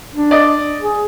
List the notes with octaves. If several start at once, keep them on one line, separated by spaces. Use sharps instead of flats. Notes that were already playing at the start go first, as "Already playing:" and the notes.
D4
D5 D#5
G#4